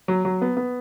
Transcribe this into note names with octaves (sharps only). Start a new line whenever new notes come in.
F#3
F#3
B3
B3